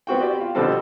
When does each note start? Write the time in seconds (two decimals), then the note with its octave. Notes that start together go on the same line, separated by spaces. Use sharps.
0.07 B3 C4 F#4 G5
0.21 G4 D5 G5
0.40 F4
0.55 B2 D3 F3 G3 C4 A4